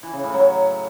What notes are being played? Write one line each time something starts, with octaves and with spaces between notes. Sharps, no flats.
E3
C#3
A2
F#3